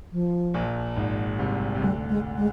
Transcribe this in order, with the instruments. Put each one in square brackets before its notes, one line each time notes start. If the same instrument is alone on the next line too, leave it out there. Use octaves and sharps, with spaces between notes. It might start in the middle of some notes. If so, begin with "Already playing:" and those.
[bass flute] F3
[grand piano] A#1 A#2
G#1 G#2
C2 C3
C3
[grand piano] D2 D3 [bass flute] G3
[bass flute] G#3
G#3